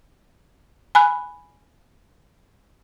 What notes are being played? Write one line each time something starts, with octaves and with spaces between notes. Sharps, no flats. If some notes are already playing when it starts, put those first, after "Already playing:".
G#5 B5 F#6